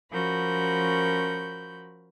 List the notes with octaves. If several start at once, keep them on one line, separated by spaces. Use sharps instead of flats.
F3 C#4 F#4 A#4 B5 G6